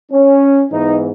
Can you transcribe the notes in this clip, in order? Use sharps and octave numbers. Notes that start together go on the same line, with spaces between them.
C#4
G#2 E3 B3 D#4